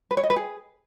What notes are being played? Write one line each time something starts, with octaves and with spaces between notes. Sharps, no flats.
B4
C#5
D#5
B4
G#4